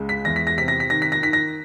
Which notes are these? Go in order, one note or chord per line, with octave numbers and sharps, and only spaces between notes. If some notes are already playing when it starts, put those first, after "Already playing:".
Already playing: C#2 G#3
B6
E2 A#6
B6
A#6
C3 B6
A#6
B6
D#3 A#6
B6
A#6
D#3 B6
A#6